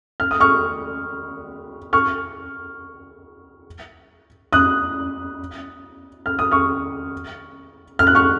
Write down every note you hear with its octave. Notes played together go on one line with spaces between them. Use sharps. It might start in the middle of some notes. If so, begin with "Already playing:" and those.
F6
D#6
C#6 F6
C#6 F6
D#6 F#6
F6
D#6
C#6 F6
F6
F#6
C#6 F6